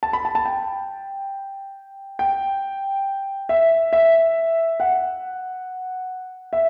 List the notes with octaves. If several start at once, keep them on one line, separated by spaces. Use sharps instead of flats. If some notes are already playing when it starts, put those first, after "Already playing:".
A5
B5
A5
A5
G5
G5
E5
E5
F#5
E5